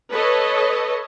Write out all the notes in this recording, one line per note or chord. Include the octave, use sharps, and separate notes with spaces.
A4 B4 C#5 D#5